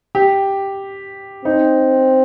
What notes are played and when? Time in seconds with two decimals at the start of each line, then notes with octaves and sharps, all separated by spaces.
0.15 G4
1.45 C4 D#4